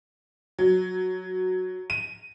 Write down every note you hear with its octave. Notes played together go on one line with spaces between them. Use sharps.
F#3
D#7